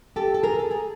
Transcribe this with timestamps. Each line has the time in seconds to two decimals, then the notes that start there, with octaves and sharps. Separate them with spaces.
0.16 G4 A4
0.34 A4
0.43 G#4 A#4
0.59 A4
0.71 G#4 A#4